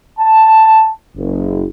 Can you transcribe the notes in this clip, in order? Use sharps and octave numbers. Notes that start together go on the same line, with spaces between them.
A5
F#1